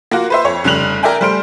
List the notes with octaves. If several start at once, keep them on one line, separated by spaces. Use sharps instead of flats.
A#3 F4 F#4
B4 C5 E5
F2 C#5
F1 C#3 G3 F#6 F7 F#7
A#4 D5 E5 G5 G#5
G3 A3 C5 F6 D7